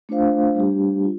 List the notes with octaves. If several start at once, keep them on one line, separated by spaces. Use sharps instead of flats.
A3 D4 F4 C5 F5
G3 D4 G4
F4